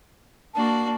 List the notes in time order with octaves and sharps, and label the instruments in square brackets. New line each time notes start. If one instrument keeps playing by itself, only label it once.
[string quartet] A#3 D4 F#4 [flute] A5